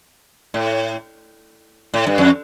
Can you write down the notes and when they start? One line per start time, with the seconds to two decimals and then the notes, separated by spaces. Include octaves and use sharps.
0.54 A2
1.94 A2
2.07 G2
2.18 F2